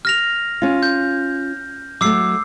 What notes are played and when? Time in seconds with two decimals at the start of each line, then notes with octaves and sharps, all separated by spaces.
0.05 F6 A#6 F7
0.62 C#4 F4
0.83 G6
2.01 F#3 A3 D6 E6 C7